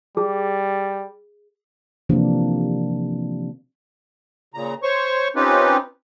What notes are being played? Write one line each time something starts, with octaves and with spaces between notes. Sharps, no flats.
G3 G#4
C3 E3 F3 A#3 D4
A#2 C#3 A#5
C5 C#5 C#6
C4 C#4 D#4 F4 G4 B4